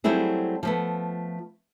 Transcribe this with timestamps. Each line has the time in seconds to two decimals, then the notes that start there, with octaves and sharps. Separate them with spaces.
0.04 F#3 G3 A3 C4 E4 G#4
0.63 F3 A3 B3